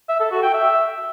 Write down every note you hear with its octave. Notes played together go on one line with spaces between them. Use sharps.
E5
A4
F#4
G5
E5